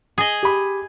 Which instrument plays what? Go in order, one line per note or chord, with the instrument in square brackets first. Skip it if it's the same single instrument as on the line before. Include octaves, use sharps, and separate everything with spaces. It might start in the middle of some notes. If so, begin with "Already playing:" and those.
[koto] G#4 D#5
[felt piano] G4 B5